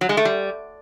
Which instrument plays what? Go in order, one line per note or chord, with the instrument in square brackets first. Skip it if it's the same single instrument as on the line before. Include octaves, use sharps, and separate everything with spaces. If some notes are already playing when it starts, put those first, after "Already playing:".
[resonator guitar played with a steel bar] F#3
G#3
A3
G3